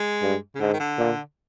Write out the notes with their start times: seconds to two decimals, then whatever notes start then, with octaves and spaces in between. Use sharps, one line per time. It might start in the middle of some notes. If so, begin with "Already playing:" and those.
Already playing: G#3
0.22 G2
0.55 C#3
0.60 G#2 D3
0.73 D#3
0.80 D3
0.98 A#2